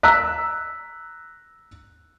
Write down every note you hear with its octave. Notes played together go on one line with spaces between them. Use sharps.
A#5 E6 F#6 B6